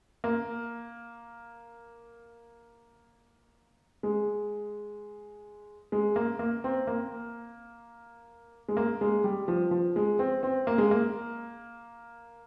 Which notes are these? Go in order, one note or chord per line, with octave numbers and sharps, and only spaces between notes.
A#3
G#3
G#3
A#3
A#3
C4
A#3
G#3
A#3
G#3
G3
F3
F3
G#3
C4
C4
A#3
G#3
A#3